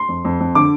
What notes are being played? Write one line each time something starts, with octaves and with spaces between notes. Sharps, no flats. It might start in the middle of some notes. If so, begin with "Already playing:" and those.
Already playing: C6
F2
F2
F2
D3 D6